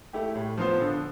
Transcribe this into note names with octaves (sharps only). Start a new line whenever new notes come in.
A3 E4 G4
A2
F3 B3 F4 C5
D3